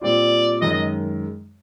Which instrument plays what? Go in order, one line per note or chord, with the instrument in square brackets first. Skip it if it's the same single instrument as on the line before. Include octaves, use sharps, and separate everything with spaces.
[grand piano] A#2 G3 C4 F4 [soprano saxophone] D5
[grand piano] F#2 D#3 G#3 [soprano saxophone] D#5
[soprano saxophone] D#5